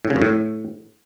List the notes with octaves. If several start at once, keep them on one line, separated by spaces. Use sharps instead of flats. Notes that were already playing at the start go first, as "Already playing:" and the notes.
A2
C#3
F#2
A2